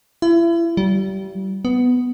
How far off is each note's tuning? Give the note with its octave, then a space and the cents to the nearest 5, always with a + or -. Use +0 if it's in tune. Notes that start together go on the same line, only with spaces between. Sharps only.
E4 +35
G3 -35
B3 +10